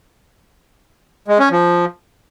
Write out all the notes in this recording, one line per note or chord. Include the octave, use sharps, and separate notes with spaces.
G#3
C#4
F3